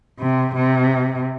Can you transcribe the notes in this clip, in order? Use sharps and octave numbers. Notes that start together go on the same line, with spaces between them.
C3
C3